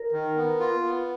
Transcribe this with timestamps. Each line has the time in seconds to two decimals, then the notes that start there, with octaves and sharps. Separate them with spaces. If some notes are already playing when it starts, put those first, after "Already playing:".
Already playing: A#4
0.12 D#3
0.36 B3
0.60 F4
0.84 B3